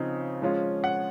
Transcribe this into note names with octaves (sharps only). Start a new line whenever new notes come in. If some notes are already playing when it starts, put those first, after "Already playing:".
Already playing: C#3 F3 C4 D#4
F3 G#3 C#4 F4
F#5